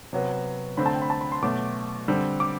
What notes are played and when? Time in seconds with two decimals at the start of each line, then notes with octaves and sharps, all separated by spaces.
0.13 C3 F#3 B3
0.77 D3 A3 C4 B5
0.86 A5
0.94 G5
1.02 B5
1.10 A5
1.21 B5
1.32 C6
1.42 B2 F#3 A3 D6
2.08 D3 G3 C4
2.40 D6